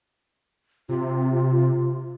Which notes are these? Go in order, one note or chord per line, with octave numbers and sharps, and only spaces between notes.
C3 F4